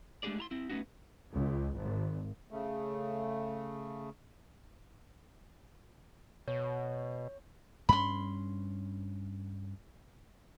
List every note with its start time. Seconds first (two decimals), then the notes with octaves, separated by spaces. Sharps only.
0.23 G#3 A3 D4 G4 G#4 D5
0.38 E4 A#5 C6
0.51 C4 E4
0.69 A3 B3 C#4 D#4 F#4
1.31 C#2
1.75 G#1
2.51 C#3 A3
6.48 B2 C#5
7.89 G2 C#4 B5 C6